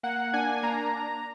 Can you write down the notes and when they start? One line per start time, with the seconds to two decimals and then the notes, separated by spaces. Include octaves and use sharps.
0.03 A#3 F#5
0.33 D4 G#5
0.63 A#3 A#5